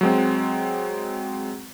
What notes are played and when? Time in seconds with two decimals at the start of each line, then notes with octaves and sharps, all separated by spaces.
0.01 F#3 G#3 C4